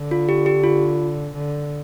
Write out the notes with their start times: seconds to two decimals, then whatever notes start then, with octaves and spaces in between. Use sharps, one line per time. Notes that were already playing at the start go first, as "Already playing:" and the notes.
Already playing: D3
0.11 F4
0.29 G4
0.46 G4
0.64 F4
1.34 D3